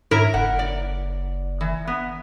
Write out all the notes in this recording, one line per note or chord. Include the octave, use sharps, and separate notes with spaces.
G#2 E4 A#4 C#5
F#1 F#5
D5
E3
B3